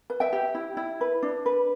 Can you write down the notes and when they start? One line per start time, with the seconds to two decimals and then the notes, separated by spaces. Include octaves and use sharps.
0.10 B4
0.20 E5 G5
0.33 G4
0.55 E4
0.77 E4
1.01 B4
1.23 D4
1.46 B4